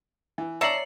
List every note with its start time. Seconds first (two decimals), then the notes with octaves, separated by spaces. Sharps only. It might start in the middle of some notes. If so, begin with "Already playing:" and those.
0.38 E3
0.61 C#5 D5 E5 A5 A#5 C7 F#7